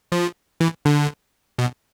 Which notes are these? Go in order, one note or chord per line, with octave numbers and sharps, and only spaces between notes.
F3
E3
D3
B2